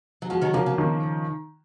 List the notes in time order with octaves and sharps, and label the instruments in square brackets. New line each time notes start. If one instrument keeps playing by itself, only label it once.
[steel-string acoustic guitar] F#3
[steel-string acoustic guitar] F3 G#3 [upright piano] F#4
[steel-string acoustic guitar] D#3 F#3
[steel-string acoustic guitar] C#3 F3 [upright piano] A#3
[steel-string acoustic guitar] C#3 F3
[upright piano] D#3